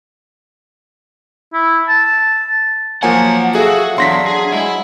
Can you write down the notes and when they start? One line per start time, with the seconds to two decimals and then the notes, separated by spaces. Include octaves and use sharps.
1.53 E4
1.89 A5
3.03 F3 F#3 A#3 F#5 G#5
3.55 F#4 G#4 A4 E5 F5
3.98 E2 F#3 D4 C6 A#6 B6
4.26 G#4
4.52 G#3 E4